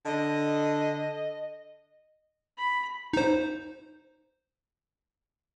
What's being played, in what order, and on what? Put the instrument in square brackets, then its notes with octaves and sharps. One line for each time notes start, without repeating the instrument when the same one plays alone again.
[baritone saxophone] D3 [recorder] D#5
[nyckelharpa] B5
[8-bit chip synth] D#4 C5